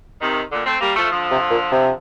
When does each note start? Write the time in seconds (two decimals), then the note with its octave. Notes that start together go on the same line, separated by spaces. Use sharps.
0.20 C3 D#3
0.51 A#2 D3
0.65 A3 C4
0.81 G3 A#3
0.96 F3 A3
1.10 D3 F3
1.31 C3
1.51 A#2
1.72 C3